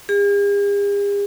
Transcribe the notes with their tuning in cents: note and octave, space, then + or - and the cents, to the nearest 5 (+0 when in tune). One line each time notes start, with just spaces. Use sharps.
G#4 -45